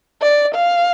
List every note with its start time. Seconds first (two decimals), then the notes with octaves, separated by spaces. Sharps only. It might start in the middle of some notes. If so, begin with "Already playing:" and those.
0.22 D5
0.55 F5